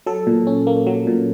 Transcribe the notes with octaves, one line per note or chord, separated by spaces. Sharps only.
F#3 A4
A#2
C#4
A#3
F#3
A#2